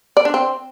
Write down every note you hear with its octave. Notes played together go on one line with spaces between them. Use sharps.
D5
D4
C4